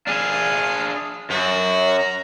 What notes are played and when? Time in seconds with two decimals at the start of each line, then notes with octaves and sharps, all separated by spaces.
0.07 D4 G#4 F5
1.30 F#2 F#4
1.99 A#5